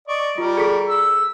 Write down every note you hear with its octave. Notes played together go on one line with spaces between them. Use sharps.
D5 D#5 C#6
G3 F4 A#4
G#4 A4 B6
E6